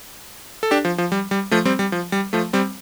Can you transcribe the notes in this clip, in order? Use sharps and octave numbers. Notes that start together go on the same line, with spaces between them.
A4
D4 G4
F3
F3
G3
G3
F3 A3
G3 C4
G3
F3
G3
F3 A3
G3 C4